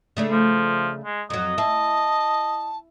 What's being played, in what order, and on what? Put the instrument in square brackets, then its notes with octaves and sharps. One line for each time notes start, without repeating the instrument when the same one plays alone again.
[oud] C#3 A3 D4
[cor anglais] F3
G#3
[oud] F2 F#3 [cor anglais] D#5
[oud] E4 [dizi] A5